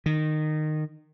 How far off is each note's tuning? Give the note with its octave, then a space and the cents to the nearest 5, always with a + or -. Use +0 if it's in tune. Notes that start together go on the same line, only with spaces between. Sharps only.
D#3 -20